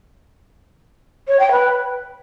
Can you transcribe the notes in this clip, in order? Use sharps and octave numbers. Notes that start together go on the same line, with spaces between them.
C#5
G5
B4